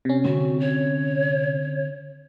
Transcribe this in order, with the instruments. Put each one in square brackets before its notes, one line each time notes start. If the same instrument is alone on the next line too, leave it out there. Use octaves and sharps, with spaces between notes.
[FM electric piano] C3 C#4
[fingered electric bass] D3 C4 [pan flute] F#4
[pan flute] C#5